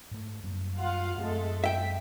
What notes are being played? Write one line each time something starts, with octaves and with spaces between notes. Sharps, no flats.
G#2 A3
F#2 G3 A#3
F4 F5 F#5
F#2 G#3 A3 C4 A4
E5 G5 B6